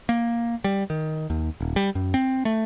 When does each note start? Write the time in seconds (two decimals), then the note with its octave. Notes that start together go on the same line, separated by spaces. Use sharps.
0.09 A#3
0.64 G3
0.90 D#3
1.30 D#2
1.60 D#1
1.76 G3
1.95 F#2
2.14 C4
2.45 A3